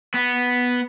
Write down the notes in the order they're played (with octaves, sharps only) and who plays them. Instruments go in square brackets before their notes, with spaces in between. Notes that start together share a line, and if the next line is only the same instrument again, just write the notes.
[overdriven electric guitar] B3